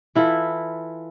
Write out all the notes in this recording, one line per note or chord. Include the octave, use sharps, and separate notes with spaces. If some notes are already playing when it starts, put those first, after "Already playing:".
E3 E4 F4 A4